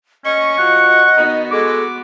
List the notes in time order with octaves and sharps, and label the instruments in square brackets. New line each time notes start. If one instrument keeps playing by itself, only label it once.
[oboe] C#4 [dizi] D#5 [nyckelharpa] C#6
[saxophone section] F3 F4 F#4 [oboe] F#5
[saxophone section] D#3 D#4 [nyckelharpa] B3 F#4
[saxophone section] G#3 [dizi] A4 [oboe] D6